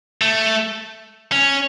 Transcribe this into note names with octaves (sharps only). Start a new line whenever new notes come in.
A3
C#4